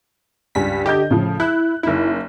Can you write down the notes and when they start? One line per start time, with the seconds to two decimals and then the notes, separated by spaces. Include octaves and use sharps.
0.55 C#2 G2 G#5 B6
0.86 D3 G4 D#5 G6
1.11 A2 C#3 F3
1.40 E4 F#6
1.83 F#1 D#4 E4